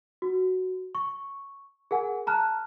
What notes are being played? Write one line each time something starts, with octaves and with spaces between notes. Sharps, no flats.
F#4
C#6
G#4 A#4 F#5 G#5
A5 A#5 F6 F#6